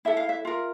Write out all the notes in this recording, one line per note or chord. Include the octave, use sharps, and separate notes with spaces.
E4 A4 E5
F5
E5
F4 A#4